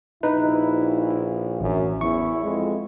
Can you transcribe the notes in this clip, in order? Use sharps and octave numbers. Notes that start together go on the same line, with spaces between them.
A#1 D#4 E4 B4
A1 F#2
E2 E4 C#6
F2 G#3